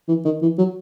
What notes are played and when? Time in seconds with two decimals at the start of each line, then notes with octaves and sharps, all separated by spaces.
0.08 E3
0.25 D#3
0.42 E3
0.58 F#3